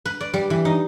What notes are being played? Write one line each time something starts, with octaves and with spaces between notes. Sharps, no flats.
B4
D5
G3
E3
D#4